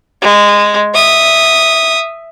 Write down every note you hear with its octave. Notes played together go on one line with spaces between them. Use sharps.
G#3
E5 D#6